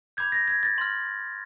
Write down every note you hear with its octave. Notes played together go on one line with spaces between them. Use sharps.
B5 D6 G6 G#6
A#6
G#6
A6
C6 F6